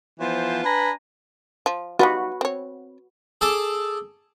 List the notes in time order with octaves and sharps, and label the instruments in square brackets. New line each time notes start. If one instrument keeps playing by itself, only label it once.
[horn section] E3 F3 B3 F4 C5
D4 B4 G#5 A#5 B5
[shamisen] F3
[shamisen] G3 D#4 F4 [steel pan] F#4 B4
[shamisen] C4 C#5
[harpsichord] G#4 A4 A5 D6